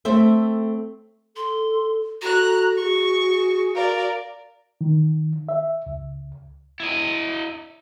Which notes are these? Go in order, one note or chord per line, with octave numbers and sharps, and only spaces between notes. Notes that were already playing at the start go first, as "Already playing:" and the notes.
A3 C4 C5 E5
A4 C6
F#4 A4 A#5 F#6
G#4 C#6
A#4 D5 F5
D#3
E5
C#2
E4 D#5